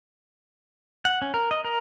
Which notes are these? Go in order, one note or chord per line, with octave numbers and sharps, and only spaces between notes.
F#5
C#4
A#4
D#5
A#4